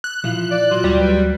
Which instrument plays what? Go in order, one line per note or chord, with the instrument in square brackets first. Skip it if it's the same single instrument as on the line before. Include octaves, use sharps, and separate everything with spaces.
[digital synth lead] F#6
[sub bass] A#2 [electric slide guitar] E3 F3 F4
[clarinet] D5
[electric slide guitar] F#3 [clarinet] F4
[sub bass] D2 [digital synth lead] G3
[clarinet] B4